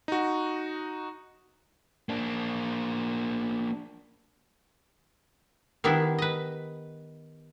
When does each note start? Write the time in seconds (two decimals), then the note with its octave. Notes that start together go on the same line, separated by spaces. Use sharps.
0.08 D#4 F#4
2.09 A#3 D4
5.84 D#3 G3 B3 D4 E4
6.18 B4 D#5